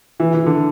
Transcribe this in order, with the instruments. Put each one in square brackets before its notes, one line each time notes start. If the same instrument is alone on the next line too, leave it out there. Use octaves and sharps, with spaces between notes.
[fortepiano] E3
E3
D3